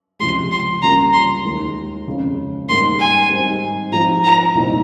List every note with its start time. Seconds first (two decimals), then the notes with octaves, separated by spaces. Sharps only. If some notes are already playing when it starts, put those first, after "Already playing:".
0.20 C#2 C3 F3 G#3 C6
0.51 C6
0.82 C#2 C#3 G3 A#3 F4 A#5
1.13 C6
1.44 D#2 D#3 G#3
2.07 F2 C#3 G#3
2.68 G#2 D#3 G3 A#3 C6
2.99 G#5
3.30 G#2 G3 C4 D#4
3.92 G#2 F3 C4 F4 A#5
4.24 A#5
4.55 C2 A#2 G3 C4 D#4